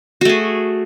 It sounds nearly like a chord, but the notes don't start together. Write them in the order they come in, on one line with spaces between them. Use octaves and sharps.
F#4 A3 G#4